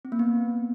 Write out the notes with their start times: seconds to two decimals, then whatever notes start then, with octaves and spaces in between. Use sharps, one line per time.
0.05 C4
0.12 A#3
0.19 B3